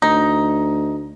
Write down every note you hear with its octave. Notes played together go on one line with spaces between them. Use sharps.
D2 D#4